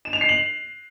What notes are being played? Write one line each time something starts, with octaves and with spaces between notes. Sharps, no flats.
E7
F7
C7
F#7